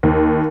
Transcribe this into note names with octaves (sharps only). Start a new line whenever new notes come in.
D#2